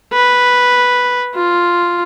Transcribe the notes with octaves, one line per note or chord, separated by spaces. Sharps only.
B4
F4